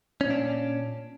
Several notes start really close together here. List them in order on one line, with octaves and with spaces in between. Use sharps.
C#4 A#2 D4